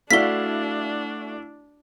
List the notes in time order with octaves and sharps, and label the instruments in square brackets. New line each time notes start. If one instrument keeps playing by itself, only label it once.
[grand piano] A3 F#4 D5 [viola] D4 [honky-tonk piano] E4 F5 [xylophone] B6 G7